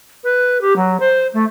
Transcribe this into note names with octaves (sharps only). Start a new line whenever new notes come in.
B4
G4
F#3
C5
A3